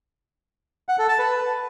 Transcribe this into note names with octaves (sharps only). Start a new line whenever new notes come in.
F#5
A4
A5
B4